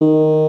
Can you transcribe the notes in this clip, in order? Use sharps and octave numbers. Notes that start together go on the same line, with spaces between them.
D#3